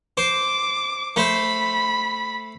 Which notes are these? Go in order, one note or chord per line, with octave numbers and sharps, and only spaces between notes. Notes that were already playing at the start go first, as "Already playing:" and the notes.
C5 D6
A3 C5 B5